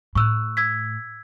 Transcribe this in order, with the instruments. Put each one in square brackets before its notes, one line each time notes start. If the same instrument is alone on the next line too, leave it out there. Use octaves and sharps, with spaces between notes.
[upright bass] A2 [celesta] C#6 E6 F#6
[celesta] E6 G#6 B6